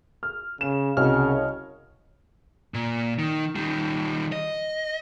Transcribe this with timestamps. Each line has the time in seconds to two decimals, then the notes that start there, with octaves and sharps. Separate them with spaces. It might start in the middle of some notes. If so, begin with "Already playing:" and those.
0.23 F6
0.61 C#3 E7
0.97 C2 C#3 F#4 C#5 D#5 F6
2.74 A#2
3.19 D#3
3.56 D#3 G3
4.32 D#5